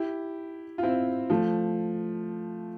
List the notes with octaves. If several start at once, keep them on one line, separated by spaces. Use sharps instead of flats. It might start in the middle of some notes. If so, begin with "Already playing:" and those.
Already playing: E4 G4
F4
C4 E4
F3 A3